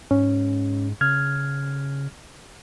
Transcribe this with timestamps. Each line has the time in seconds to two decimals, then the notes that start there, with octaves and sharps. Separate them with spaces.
0.11 G#2 C#4
1.01 C#3 F6 G#6